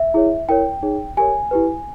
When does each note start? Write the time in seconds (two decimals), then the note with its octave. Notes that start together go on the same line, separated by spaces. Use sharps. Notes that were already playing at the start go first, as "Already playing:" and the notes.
Already playing: E5
0.14 E4 G#4 C#5
0.48 E4 A#4 C#5 G5
0.83 D#4 G#4 C#5
1.17 G4 A#4 C#5 G#5
1.51 E4 G4 B4